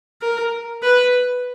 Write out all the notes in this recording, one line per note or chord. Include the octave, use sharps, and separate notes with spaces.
A#4
B4